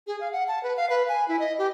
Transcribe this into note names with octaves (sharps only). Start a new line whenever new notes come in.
G#4
F5
F#5
A5
B4
F5
B4
G#5
E4
D#5
G4